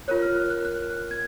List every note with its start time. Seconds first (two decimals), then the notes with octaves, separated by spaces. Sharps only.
0.08 F4 A#4 C#5 F#6
0.22 F6
0.36 F6
0.50 F#6
0.65 F#6
1.11 G#6